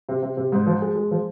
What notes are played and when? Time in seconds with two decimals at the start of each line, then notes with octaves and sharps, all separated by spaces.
0.09 C3
0.22 C3
0.37 C3
0.52 G#2
0.66 F3
0.82 G#3
0.95 G#3
1.11 F3